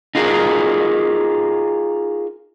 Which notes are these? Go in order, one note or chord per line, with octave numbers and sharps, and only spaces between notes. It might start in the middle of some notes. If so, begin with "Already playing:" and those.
D#4 F4 F#4 G#4 A#4